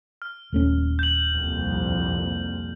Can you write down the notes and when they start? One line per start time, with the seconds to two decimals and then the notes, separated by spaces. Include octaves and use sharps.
0.22 F6
0.52 D#1 A3 C#4
0.99 G6 F#7
1.30 C2 F2 A#2